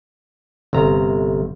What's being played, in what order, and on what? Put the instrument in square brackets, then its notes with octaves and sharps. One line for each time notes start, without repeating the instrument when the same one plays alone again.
[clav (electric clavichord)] G1 C3 A#5